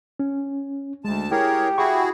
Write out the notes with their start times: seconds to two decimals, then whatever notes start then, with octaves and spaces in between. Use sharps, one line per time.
0.20 C#4
1.05 D2 G#3 A5
1.32 E4 G4 G#4 A#4 C#5
1.78 E4 F#4 G#4 F#5 C#6